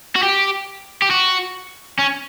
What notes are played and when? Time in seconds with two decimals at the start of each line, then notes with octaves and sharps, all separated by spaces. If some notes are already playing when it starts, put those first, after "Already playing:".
0.15 F#4
0.23 G4
1.02 G4
1.10 F#4
1.99 C#4